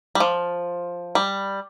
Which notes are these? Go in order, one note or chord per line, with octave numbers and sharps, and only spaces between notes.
G3
F3
G3